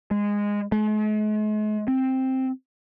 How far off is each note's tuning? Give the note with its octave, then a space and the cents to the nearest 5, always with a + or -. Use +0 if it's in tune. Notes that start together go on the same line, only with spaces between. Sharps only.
G#3 -15
G#3 +45
C4 +5